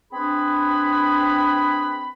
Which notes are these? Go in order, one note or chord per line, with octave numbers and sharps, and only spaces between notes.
C4 D4 G#4 B4 B5